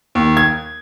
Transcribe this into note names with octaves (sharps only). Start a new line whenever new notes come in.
D#2
G#6